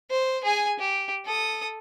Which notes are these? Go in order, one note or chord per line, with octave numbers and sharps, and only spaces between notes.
C5
G#4 G#5
G4
A4 D#6